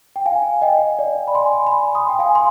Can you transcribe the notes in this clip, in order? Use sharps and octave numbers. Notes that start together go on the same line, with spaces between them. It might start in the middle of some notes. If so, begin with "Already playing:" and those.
G5
F5 G#5
D#5 G5
D5
B5
G#5 C6
B5
G#5 C6
C6 D#6
G5
F5 G#5
C6